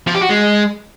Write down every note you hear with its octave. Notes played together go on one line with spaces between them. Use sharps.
F3
G4
F#4
G#3